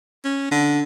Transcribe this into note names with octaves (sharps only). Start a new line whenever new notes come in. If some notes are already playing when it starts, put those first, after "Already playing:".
C#4
D3